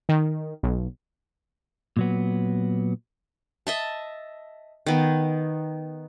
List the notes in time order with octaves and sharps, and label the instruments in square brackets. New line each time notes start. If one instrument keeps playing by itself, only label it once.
[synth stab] D#3
B1
[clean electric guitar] A#2 F#3 B3
[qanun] D#5 E5 A5
D#3 B3